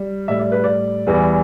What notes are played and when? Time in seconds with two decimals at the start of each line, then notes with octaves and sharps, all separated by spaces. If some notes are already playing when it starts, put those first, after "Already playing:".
Already playing: G3
0.28 A2 G3 E5
0.39 D5
0.52 B4
0.64 D5
1.07 E2 E3 G3